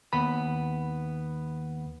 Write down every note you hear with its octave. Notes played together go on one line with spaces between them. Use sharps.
D#2 B3 B5